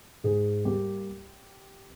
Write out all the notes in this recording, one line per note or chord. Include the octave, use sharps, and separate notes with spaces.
G#2 G#4
G3 A#3 G4